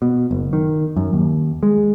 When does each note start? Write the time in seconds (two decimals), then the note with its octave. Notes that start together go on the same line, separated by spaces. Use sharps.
0.02 B2
0.31 F#1
0.53 D#3
0.97 F#2
1.13 D#2
1.63 G#3